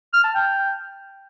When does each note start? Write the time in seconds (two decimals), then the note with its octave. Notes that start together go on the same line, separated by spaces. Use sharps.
0.13 F6
0.24 A5
0.35 G5